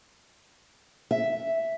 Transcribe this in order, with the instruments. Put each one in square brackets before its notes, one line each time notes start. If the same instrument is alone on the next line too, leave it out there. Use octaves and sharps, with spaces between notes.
[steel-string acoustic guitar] E5